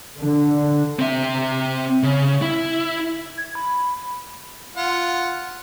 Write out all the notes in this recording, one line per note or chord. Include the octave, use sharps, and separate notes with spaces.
D3
C4 E5
C#3
E4
G#6
B5
F4 F#5